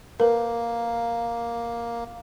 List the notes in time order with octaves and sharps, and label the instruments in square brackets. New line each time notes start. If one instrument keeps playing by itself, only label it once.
[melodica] A#3 [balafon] A#4 B4